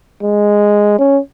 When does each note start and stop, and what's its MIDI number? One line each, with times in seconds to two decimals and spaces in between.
0.22 0.97 56
0.99 1.19 61